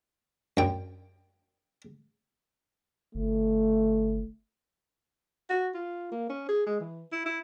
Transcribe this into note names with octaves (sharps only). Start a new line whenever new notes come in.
F#2 G5
G1 A3
F#4
F4
A#3
C#4
G#4
G#3
E3
E4
E4